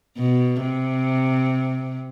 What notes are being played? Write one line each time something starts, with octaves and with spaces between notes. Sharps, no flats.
B2
C3